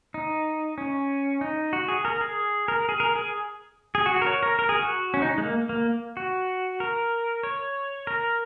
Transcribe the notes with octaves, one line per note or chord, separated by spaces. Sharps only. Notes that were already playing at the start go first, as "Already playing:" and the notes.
D#4
C#4
D#4
F#4
G#4
A#4
G#4
A#4
G#4
A#4
G#4
G#4
F#4
F#4
A#4
C#5
A#4
A#4
G#4
F#4
C#4
D#4
G#3
A#3
A#3
F#4
A#4
C#5
A#4